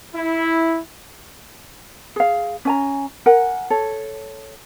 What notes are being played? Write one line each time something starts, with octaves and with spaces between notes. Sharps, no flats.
E4
G#4 F5
C#4 G#5 A#5
A#4 F#5 G#5
A4 C#5